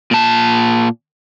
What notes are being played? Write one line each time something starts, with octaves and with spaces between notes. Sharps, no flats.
A#2 A5